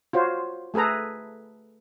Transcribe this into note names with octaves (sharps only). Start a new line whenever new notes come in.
F4 F#4 C5 C#5
A3 G#4 A4 B4 A#5